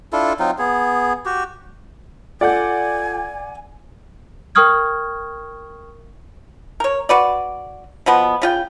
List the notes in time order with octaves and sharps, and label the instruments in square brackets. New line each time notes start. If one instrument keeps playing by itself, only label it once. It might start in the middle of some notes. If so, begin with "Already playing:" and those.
[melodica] D4 E4 F4 A4
F#3 C4 D#4 F4
B3 G#4
F#4 G4
[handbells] F4 A4 G6 [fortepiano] D5 F#5 [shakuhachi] G#5
[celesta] A#4 G5 C#6 D#6 F6 G#6
[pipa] A#4 C#5
F#4 B4 D5
B2 F3 B3
C#3 F4 G5